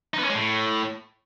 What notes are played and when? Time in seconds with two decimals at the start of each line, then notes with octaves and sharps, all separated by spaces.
0.14 D#4
0.19 B3
0.24 C#4
0.29 G#3
0.34 A2